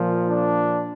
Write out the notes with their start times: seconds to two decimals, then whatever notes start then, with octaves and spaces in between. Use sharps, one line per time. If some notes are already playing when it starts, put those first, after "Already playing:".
Already playing: A#2 F3
0.28 D4